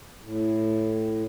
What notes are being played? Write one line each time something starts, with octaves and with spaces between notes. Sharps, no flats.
A2